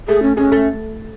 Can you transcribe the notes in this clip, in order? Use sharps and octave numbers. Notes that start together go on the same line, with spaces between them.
A3 G#4
C#4
G#3 C#4
A3